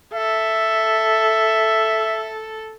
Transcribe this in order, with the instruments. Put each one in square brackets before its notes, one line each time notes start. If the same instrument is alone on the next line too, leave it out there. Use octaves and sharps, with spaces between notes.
[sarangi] A4 [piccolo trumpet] E5